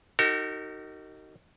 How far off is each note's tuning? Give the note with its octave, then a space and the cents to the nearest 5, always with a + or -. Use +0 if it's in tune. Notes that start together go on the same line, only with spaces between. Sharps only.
D#4 +0 F#4 +35 A#4 -40